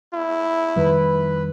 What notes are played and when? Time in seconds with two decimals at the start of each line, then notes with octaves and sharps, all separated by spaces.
0.13 E4
0.76 F2 D#3 G3 B4